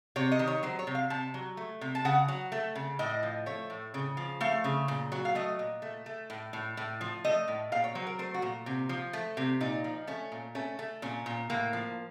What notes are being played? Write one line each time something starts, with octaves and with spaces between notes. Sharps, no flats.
C3 C#5
D#5
D#3
C#5
F#3 C5
C#5
C3
F5
C3 A5
F#3
A3
C3
A5
C#3 F#5
F#3
A3
C#3
A2 D#5
F3
A3 C#5
A2
C#3
F3
A3 F5
C#3
A#2
F#3
F5
A3 D#5
A#2
A3
A3
A2
A2
A2
F3
A3 D#5
A2
A#2 F5
C#5
F#3 C5
A#4
A3 C5
F#4
A#2
C3
F3
A3
C3
A#2 D#4
F3
A3 C#4
A#2
A3 C#4
A3
A#2 C#4
A#2
A2 A#3
F3